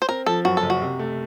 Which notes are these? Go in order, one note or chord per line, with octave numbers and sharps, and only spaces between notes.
C5
C4 A#4
F3 A4
F#2 F#4
A4
F#1
F#4
C3
A3